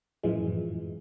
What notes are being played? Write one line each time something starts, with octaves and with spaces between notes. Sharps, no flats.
F#2 A2 E3 F3 G#3